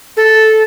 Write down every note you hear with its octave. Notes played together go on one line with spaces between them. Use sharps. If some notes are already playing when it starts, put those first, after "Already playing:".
A4